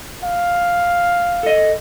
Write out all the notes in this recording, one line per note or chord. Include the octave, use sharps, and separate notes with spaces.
F5
A4 D#5